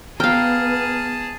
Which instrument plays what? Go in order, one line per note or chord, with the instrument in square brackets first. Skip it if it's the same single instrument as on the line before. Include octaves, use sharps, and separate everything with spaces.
[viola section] B3 [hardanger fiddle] G#4 A5 [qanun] F5 G5 [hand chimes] A#5 F6